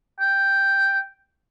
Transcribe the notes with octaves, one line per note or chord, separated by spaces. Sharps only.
G5